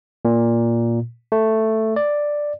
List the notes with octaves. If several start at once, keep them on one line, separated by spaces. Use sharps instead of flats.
A#2
A3
D5